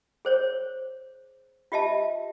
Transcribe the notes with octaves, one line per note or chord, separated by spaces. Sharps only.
G#4 C5 C#5
F4 G4 D#5 E5 A5